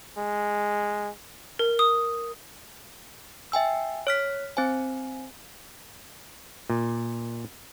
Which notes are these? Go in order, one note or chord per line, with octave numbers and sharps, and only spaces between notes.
G#3
A#4
D#6
E5 G5 G#5 E6
C#5 F6 B6
C4 C5 G#5
A#2